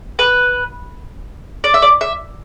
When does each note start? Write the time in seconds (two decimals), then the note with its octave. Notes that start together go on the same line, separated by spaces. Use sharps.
0.19 B4
1.64 D5
1.74 E5
1.82 D5
2.01 E5